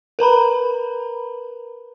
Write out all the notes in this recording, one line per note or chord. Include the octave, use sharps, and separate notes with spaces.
A#4 B4 A#5 B5